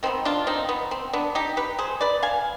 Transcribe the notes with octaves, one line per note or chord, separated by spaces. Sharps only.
D#3 G3 B3 C4
D4 F4
C4 D#4
B3
C4
B3 D4
D#4 G4
G4 B4
G#4 C5
B4 D5
F5 G#5